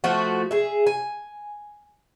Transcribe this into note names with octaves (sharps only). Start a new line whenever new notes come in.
F3 A3 F#4
G#4 E5
G#5